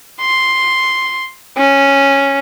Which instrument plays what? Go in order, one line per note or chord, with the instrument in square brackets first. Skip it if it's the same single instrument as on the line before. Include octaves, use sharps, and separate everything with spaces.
[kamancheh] C6
C#4